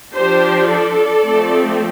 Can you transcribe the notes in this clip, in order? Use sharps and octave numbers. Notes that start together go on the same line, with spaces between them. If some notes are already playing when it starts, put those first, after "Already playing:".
F3 D4 G4 C5
A4 D5
F3 A3 C4